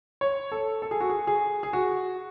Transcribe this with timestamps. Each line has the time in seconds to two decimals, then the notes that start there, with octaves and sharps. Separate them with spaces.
0.21 C#5
0.52 A4
0.82 A4
0.91 G#4
1.00 F#4
1.10 G#4
1.27 G#4
1.63 G#4
1.73 F#4